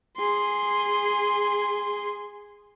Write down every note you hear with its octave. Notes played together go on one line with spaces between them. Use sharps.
G#4 C6